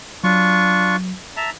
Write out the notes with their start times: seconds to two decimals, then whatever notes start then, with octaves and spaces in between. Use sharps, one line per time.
0.24 F#3 D4 F4 C#6
1.37 E5 A5 A#5